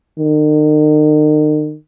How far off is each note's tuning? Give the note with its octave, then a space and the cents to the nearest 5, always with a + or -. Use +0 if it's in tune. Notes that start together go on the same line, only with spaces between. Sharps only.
D#3 -40